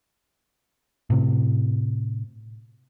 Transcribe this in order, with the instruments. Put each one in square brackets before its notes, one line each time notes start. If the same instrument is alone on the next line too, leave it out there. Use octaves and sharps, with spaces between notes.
[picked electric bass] A2 C3